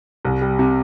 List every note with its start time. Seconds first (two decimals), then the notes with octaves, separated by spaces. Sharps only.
0.25 C2
0.42 G3
0.59 C3